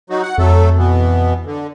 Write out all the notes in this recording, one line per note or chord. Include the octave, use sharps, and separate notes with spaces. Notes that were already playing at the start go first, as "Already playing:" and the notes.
F#3 D#4 F#4
F#5
F2 F#3 A3 A4
B2 E3 B3
D3